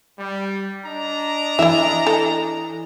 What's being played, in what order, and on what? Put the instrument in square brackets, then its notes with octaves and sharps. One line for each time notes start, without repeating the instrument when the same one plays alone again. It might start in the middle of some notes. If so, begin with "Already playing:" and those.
[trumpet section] G3
D4 D#5 A#5
[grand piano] E3 [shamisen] E4 E5
[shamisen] A4